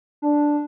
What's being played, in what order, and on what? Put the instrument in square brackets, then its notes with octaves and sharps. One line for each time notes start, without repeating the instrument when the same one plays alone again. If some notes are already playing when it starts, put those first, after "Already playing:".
[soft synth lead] D4